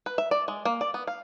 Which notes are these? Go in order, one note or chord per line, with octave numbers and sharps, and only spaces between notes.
B4
E5
D5
G#3
A#3
D5
B3
F5